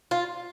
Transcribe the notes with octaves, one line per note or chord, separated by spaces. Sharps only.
F4